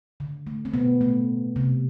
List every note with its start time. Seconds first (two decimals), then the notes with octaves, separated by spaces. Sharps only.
0.20 D3
0.47 A3
0.65 C4
0.74 B2 B3
1.01 A3
1.56 C3